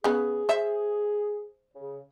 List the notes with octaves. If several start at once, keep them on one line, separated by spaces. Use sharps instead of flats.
C#3 B3 G#4
C5 E5
C#3